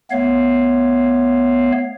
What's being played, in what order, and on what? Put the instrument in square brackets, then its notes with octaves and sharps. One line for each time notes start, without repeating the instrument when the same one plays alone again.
[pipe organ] A3 B3 C#5 F5